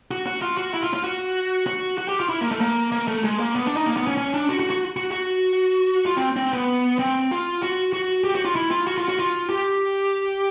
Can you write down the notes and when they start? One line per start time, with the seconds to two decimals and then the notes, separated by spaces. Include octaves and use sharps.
0.11 F#4
0.27 F#4
0.42 F4
0.57 F#4
0.74 E4
0.83 F4
0.94 F4
1.04 F#4
1.67 F#4
1.98 F#4
2.08 G4
2.20 F4
2.29 E4
2.41 A#3
2.51 A3
2.61 A#3
2.92 A#3
3.08 A3
3.24 G#3
3.39 A#3
3.56 B3
3.66 D4
3.77 D#4
3.86 A#3
3.97 B3
4.07 C#4
4.17 C#4
4.34 D4
4.49 F#4
4.60 F#4
4.70 F#4
4.97 F#4
5.12 F#4
6.06 F4
6.17 C4
6.36 C4
6.53 B3
6.99 C4
7.31 F4
7.63 F#4
7.94 F#4
8.24 G4
8.35 F#4
8.45 F4
8.56 E4
8.71 F4
8.87 F#4
8.98 F4
9.08 F#4
9.19 F4
9.50 G4